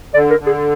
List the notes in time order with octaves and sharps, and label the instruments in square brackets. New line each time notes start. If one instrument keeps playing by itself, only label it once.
[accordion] D3 [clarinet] D5
[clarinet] A#4
[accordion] D3
[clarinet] G#4